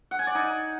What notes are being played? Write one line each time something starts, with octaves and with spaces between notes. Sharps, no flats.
F#5
G#5
D5
D#4